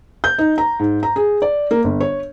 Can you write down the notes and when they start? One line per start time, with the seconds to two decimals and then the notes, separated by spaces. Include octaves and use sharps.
0.24 G6
0.38 D#4
0.58 A#5
0.79 G#2
1.03 A#5
1.16 G#4
1.42 D5
1.71 A#3
1.84 G1
2.00 C#5